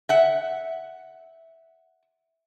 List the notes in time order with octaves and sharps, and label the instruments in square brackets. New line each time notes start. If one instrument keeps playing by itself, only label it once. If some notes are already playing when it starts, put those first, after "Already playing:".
[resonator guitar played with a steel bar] E5 F#5